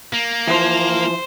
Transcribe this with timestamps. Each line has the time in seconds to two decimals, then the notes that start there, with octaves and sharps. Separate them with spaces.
0.13 A#3
0.47 E3 F3 C5